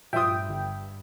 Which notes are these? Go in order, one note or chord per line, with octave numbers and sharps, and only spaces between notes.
G2 A#2 F3 F4 E5 G5 D#6
G1